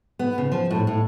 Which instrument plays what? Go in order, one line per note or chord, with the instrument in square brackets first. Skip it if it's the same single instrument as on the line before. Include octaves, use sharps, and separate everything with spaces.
[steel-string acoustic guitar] B3
C#3
F3
A2
A2